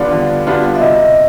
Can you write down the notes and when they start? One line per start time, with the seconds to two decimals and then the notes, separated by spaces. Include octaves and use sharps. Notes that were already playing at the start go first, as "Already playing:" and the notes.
Already playing: D3 G3 B3 D4 F4 D5
0.12 D3
0.47 G3 B3 D4 F4
0.75 E5
0.80 C3 D#5